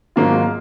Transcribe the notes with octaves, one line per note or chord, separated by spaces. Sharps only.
G#1 G#2 F#3 A#3 F4